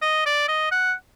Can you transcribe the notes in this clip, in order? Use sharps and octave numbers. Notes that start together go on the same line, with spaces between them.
D#5
D5
D#5
F#5